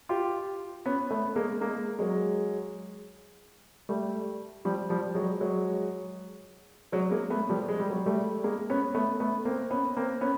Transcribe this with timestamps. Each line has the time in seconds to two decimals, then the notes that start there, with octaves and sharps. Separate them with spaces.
0.09 F4 G4
0.86 B3 C#4
1.11 A3 B3
1.36 G#3 A#3
1.61 G#3 A#3
1.99 F#3 G#3
3.89 G3 A3
4.65 F3 G3
4.90 F3 G3
5.15 F#3 G#3
5.40 F#3 G#3
6.92 F#3 G#3
7.11 G#3 A#3
7.30 A3 B3
7.49 F3 G3
7.68 G#3
7.80 G3
7.90 F#3 G#3
8.06 G3 A3
8.44 G#3 A#3
8.70 B3 C#4
8.95 A3 B3
9.20 A3 B3
9.45 A#3 C4
9.71 B3 C#4
9.97 A#3 C4
10.21 B3 C#4